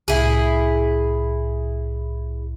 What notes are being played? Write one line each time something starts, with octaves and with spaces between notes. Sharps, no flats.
C2 A2 E4 G#4